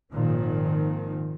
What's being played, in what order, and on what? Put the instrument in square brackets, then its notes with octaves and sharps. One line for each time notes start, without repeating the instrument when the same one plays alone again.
[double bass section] G#1 A#2 D#3 F3